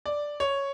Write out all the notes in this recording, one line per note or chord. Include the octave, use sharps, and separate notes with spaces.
D5
C#5